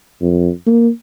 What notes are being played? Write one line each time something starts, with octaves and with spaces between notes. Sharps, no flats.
F2
A#3